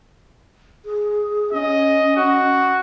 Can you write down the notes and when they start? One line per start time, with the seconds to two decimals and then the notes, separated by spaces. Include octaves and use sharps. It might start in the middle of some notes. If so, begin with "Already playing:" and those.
0.85 G#4
1.53 C#4 D#5
2.16 F#4